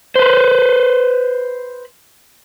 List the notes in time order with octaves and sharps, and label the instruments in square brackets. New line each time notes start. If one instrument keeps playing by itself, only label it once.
[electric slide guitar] B4 C5